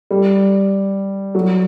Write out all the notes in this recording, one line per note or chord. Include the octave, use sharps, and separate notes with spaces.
G3
F#3